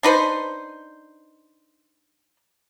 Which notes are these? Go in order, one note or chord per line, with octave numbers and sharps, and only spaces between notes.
D4 D#4 B4 C5